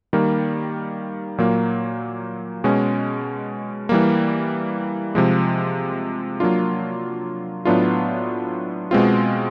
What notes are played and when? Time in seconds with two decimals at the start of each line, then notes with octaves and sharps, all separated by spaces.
0.13 D#3 G3 A#3
1.38 A#2 F#3 A#3
2.64 B2 G#3 C#4
3.89 E3 G3 A#3
5.15 C3 F3 G#3
6.40 F#3 A#3 D4 F4
7.65 A2 F#3 B3 D4 F4
8.91 B2 G#3 C4 F4